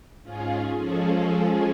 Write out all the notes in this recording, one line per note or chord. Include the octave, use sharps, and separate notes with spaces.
G#2 C#4 F4 G#4
F3 G#3 C#4 G#4 A4